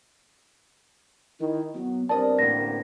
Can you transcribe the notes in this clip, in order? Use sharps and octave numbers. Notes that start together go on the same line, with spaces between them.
D#3 E4
F#3 B3
G2 C3 A#4 D5 D#5 A5
A1 A2 D3 A#3 C4 A#6